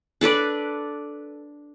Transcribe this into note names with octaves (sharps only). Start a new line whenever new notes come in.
D4 A4 B4 D5